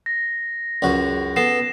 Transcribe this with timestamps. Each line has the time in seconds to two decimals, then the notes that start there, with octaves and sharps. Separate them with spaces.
0.06 A#6
0.82 C#2 F#2 F#4
1.36 B3 A4 A#6 C7 E7